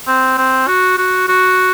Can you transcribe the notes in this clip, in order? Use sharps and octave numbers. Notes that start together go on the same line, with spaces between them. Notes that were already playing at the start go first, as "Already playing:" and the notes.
C4
C4
F#4
F#4
F#4